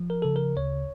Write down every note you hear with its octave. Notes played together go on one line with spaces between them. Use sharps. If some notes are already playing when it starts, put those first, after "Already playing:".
Already playing: F3
A#4
C#3 A4
A#4
D2 C#5